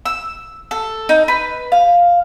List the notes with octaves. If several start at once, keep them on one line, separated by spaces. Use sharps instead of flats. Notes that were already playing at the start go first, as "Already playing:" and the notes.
E6
A4
D#4
B4
F5